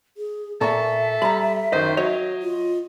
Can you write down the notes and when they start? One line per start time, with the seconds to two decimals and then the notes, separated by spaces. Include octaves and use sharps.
0.17 G#4
0.61 A#2 A#3 A4 E5 A5 A#5 C#6
1.22 G3 A#5 B5
1.73 F#2 D#3 C5 D#5
1.97 F#3 C#5 D#5
2.42 F4